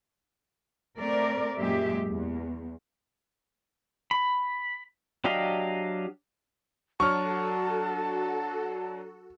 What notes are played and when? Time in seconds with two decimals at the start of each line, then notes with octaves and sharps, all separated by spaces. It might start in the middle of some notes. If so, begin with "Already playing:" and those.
0.98 A3 C4 A#4 D5
1.58 F#2 A#2 G#3 G4 E5
2.06 E2
4.11 B5
5.24 F#3 D4 G4 D#5 F5
7.00 F#3 D4 F#4 A4 C#5 A5 C#6 F6